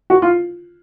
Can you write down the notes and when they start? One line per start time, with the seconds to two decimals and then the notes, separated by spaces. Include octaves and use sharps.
0.10 F#4
0.22 F4